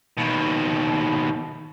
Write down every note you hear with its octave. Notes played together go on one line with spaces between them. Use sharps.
D#2 B2